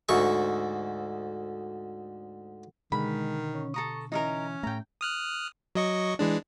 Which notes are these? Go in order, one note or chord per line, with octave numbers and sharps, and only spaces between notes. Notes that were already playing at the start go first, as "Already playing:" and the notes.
D2 G#2 C#6
B2 D3 D#3 G#3 B5
C#4
A4 A#5 C#6 D#6
E3 C#4 D#4 A4 A#4
A2 A3 G5 A#5
D#6 F6 F#6
F#3 D#5 C#6
E3 G#3 D4